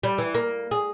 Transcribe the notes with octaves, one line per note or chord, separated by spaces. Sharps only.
G3
E3
A#3
G#4